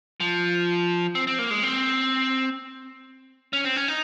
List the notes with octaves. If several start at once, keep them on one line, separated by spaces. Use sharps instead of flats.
F3
C4
C4
A#3
G#3
C4
C#4
C4
C#4
D#4